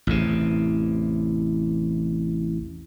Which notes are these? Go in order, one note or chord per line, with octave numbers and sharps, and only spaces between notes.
A1 E2 C3